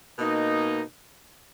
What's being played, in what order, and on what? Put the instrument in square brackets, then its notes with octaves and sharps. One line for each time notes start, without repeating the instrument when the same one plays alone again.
[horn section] B2 A#3 D#4